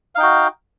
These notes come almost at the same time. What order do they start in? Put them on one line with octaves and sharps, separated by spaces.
F5 D#4 G5 F#4